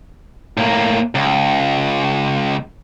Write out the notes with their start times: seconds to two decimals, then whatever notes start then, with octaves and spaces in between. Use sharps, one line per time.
0.57 A2 A#3
1.15 C#2